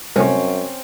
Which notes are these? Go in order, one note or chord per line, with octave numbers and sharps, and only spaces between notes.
C2 F#2 A2 C4 C#4